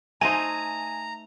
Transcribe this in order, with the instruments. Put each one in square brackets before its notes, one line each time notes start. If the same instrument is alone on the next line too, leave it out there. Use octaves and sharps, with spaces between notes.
[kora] A3 D#4 C5 [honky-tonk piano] G#5 D#7 F7 [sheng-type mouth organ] A#5